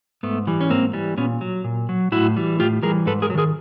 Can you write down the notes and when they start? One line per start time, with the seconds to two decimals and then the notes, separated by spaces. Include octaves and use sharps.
0.23 G#2 A3 B3
0.47 E3 G3
0.61 C#4
0.70 G#2 A#3 C4
0.93 E3 G3
1.17 A#2 B3 C#4
1.41 F#3
1.64 A#2
1.89 F#3
2.12 A2 E4 F#4
2.36 E3 G3
2.60 A2 F4 G4
2.82 E3 G3 G#4 A#4
3.06 G#2 A4 B4
3.22 G#4 A#4
3.30 F#3
3.35 D#3 G#4 A#4